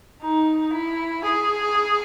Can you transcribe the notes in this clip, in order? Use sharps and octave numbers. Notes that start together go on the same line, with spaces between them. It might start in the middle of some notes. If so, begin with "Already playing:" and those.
D#4
E4
G#4